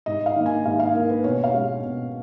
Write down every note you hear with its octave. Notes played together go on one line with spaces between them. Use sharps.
G#2 D#5
F5
D#3 A#3
G#5
G#2 F5
F5
D#3 A#3 A#4
B4
B2 C#5
F5
G#3 C#4
B2